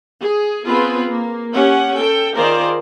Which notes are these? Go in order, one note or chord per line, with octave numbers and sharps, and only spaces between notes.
G#4
B3 C4 F4 G#4 B4
A#3
C#4 G4 F#5
A4 G5
D#3 F4 G#4 A#4 C5 D5